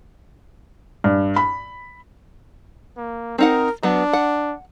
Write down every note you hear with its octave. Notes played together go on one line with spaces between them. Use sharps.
G2
B5
A#3
C4 D#4 A#4 F#5
F#3 B3 D4
F#5